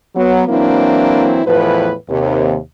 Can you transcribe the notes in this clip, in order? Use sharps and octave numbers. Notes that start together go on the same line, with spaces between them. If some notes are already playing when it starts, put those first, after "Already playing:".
F#3 B3
E3 F#3 A#3 C4 D4 E4
E2 A2 F3 B4
D#2 C3